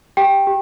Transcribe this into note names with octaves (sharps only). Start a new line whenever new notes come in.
G4 G5
G4